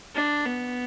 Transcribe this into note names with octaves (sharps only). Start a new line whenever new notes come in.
D4
B3